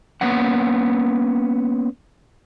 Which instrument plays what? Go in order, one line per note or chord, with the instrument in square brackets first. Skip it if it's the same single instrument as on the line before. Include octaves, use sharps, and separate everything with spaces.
[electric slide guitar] A#3 B3 C#4 F#5